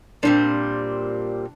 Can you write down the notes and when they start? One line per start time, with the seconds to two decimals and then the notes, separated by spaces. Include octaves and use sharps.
0.23 A#2 G3 C4 D4